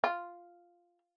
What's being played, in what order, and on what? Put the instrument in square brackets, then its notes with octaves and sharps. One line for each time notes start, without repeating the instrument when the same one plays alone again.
[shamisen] F4